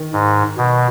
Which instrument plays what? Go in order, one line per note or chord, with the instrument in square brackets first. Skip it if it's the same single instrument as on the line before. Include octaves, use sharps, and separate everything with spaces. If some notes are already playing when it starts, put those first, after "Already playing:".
Already playing: [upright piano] D#3
[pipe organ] G#2
B2